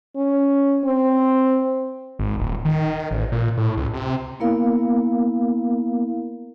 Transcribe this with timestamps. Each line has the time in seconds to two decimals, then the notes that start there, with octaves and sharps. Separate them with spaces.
0.16 C#4
0.84 C4
2.19 G#1
2.39 D#1
2.65 D#3
3.11 A1
3.32 A#2
3.57 A2
3.77 C#2
3.94 C3
4.40 A#3 B3 E4 A#4 F5